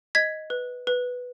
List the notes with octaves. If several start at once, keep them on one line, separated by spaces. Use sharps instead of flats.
D#5 G#6 B6
B4
B4